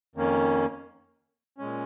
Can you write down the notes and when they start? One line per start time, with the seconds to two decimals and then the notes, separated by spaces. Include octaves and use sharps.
0.15 F2 D#3 A#3 C#4
1.58 A#2 G#3 C#4